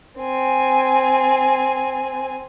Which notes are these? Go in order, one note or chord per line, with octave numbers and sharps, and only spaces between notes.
C4 G#5